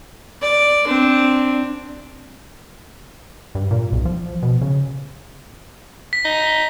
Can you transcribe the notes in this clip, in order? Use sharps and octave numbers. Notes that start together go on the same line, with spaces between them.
D5
C4 D4
G2
A#2
B1
F3
B2
C#3
B6
D#4